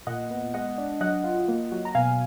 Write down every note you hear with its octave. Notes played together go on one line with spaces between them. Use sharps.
A#2 D#5 F#5
B3
G#3 D#5 F#5
D4
F#3 D#5 F#5
F4
A#3
F#3
A#5
B2 F5 G#5